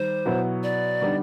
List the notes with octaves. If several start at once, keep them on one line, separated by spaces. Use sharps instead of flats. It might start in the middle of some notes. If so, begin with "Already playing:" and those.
Already playing: D#3 G3 C5
B2 F#3 B3 E4
D5
D3 G3 B3 D#4